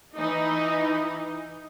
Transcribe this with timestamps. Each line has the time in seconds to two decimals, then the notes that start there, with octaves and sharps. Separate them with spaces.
0.17 E3 D#4